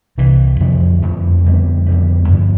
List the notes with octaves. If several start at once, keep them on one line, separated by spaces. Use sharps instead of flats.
C2 C3 E3
F2 D3 F3 A3
F2 D3 F3 A3
F2 D3 G3 B3
F2 D3 G3 B3
G2 D3 F3